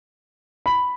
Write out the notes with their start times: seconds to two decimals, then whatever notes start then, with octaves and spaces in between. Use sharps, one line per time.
0.66 B5